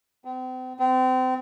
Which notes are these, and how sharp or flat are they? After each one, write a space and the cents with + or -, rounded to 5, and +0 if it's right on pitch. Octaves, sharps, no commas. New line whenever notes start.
C4 -40
C4 -30